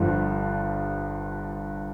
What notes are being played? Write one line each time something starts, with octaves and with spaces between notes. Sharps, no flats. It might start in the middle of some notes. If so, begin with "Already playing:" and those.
Already playing: G1 G2 F3